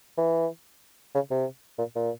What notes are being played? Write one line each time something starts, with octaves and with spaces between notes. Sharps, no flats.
E3
C#3
C3
A#2
A#2